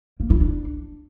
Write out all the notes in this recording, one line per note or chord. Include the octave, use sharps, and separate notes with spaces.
A#3
E4
D4